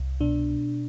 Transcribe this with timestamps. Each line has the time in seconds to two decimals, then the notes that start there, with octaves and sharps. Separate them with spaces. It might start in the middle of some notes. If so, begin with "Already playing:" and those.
Already playing: C2
0.21 B2 D4